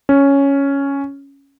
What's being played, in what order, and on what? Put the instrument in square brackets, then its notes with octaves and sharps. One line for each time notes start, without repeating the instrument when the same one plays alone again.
[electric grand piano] C#4